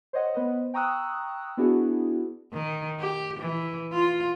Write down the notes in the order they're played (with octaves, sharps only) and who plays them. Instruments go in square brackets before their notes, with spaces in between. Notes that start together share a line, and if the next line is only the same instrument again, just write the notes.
[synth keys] C5 C#5 D#5 F#5
B3 B4 C5 D#5
G5 A#5 C#6 D#6 E6 F#6
B3 D4 E4 F#4 G#4
[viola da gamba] D#3
G4
E3
F4